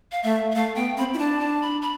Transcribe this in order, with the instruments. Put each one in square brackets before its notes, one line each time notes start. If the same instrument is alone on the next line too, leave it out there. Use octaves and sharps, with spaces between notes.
[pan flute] F5
[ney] A3 [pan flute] E5
[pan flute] E5
[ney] A3 [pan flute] F5
[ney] B3 [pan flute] G5
[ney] C4 [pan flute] B5
[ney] E4
[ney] D4 [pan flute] A5
[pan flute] A5
B5
B5